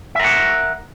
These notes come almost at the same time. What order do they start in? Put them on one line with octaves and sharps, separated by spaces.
E5 A#4 F#5